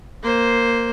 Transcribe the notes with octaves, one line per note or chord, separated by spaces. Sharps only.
A#3 C5